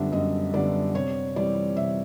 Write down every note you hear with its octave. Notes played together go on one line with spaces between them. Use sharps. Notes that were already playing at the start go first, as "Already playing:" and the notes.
Already playing: F#2 D3 G3 B3 D4 E5
F#2 D#5
D3 G3 B3 D4 D5
C3 C#5
E3 G3 C4 D5
C3 E5